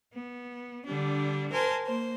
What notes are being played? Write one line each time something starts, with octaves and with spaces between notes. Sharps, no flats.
B3
D3 G3 D4
A#4 C5 G#5 A5 C6
A#3 C5